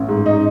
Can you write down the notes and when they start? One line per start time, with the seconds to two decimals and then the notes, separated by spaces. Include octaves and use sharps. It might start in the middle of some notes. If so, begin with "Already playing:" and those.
Already playing: A1
0.08 G#2
0.26 D#4